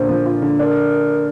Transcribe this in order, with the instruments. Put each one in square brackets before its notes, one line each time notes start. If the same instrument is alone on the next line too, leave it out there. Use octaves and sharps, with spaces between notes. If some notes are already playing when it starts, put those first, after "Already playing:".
Already playing: [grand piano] A#2 D3 A#3 F4 [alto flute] C5
[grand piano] F3
F4
D3
[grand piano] D4 [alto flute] A#4